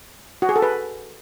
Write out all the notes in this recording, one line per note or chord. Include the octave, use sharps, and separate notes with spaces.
F#4
G#4
A4
B4